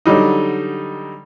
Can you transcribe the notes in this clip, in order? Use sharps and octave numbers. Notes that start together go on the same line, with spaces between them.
D3 F#3 G3 D#4